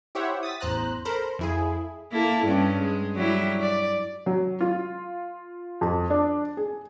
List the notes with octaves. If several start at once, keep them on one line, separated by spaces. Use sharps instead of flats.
E4 G4 C5 C#5 E5 F#5
D#6 A6 B6
A1 E2 C5 A#5 F#6
A4 A#4 C5 A#5 B5
F2 E4 G#4
A#3 E4 A4
G2 G3 C#4
G#3
F#3 G3 E4
D5
F#3
F4
F2
D4
G#4